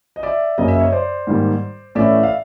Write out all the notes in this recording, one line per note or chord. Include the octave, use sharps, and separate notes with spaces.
D#5
D5 E5
F#2 C#3 F#3 A#3 D#5
E5
C#5 D#5
C5 D5
G#2 D#3 G3 A#3
A2 E3 A3 C#4 D5 E5
F5